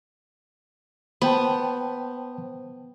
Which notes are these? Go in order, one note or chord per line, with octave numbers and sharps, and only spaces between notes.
B3 C5 G5 A5